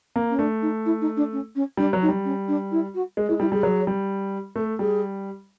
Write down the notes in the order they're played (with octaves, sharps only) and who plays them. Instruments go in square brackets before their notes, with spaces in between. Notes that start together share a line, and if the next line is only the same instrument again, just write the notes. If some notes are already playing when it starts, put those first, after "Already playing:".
[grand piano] A#3
[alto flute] C#4
[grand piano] A3 [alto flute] D4
[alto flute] D#4
E4
D#4
D4
C#4
C#4
[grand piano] G3 [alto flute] D4
[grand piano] F#3
[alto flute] D#4
[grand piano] G3
[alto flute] C#4
D4
E4
F#4
[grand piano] G#3
[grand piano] G#3 [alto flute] E4
[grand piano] G3 [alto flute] E4
[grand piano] G3 [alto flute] G#4
[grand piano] F#3
G3
[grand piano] A3 [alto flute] A4
[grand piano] G3 [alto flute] G#4